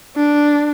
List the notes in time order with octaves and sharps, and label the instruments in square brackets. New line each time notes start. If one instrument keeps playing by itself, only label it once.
[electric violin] D4